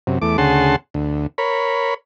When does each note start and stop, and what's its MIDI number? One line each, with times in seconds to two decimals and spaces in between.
0.07 0.19 42
0.07 0.19 48
0.22 0.37 40
0.22 0.37 57
0.22 0.37 86
0.38 0.76 38
0.38 0.76 49
0.38 0.76 68
0.38 0.76 78
0.38 0.76 81
0.38 0.76 84
0.94 1.27 38
1.38 1.94 70
1.38 1.94 73
1.38 1.94 83